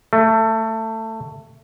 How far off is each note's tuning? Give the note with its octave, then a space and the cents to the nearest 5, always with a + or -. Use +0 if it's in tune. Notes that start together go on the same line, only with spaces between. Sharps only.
A3 +20